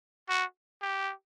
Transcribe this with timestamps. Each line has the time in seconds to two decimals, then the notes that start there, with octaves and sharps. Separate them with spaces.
0.29 F#4
0.82 G4